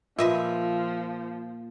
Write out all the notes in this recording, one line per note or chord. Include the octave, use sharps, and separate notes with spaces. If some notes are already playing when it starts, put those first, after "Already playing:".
A#2 F3 B4 D#5 E5